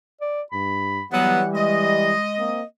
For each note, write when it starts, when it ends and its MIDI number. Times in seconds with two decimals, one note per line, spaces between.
0.21 0.42 74
0.52 1.00 43
0.52 1.05 83
1.12 2.14 52
1.12 1.41 54
1.12 2.14 55
1.12 1.41 59
1.12 1.48 78
1.54 2.55 56
1.54 2.63 75
2.37 2.61 58
2.37 2.61 60